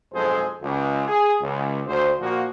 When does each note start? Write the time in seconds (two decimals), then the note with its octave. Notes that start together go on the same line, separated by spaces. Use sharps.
0.14 B1 F2 G#3 G#4 A4 C5
0.61 C#2
1.07 G#4
1.41 C#2
1.87 D2 C5
2.20 A#2 F3 A#3 F#4